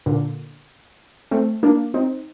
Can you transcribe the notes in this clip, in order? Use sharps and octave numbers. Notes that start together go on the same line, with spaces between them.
A#2 D3
A3 C4
A#3 D4
C4 D#4